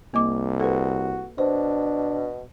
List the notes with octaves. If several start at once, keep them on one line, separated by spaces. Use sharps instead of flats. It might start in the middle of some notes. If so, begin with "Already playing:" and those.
C2 A#3 D#5 D6
F#4 A4 B4
B2 D4 C5